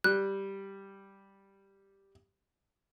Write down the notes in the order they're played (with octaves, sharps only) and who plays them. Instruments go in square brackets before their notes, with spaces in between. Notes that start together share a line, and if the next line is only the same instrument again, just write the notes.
[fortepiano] G3 [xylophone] F#6